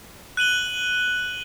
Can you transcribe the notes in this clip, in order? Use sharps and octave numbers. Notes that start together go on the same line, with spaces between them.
F#6 D#7 F#7 G7